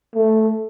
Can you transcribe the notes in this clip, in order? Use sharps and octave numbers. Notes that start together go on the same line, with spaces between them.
A3